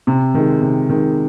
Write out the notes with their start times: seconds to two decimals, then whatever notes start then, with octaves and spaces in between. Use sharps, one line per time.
0.07 C3
0.34 D#3 G#3
0.62 C3
0.89 D#3 G#3